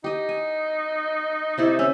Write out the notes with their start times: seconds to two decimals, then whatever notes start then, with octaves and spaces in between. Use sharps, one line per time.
0.04 D#4 G4 D#5
0.29 G#5
1.58 C3 E4 D5
1.79 C#4 E5